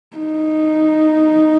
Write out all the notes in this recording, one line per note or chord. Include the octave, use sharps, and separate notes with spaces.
D#4